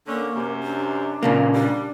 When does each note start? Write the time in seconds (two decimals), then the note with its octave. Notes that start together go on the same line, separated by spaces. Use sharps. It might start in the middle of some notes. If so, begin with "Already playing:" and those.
0.07 D3 A#3 C#4 D4
0.35 F#2 C3
0.63 D4
1.23 A#2 C#3 A#3
1.53 G3 D4